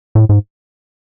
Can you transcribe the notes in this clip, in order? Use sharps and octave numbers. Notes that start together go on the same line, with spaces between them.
A2
G#2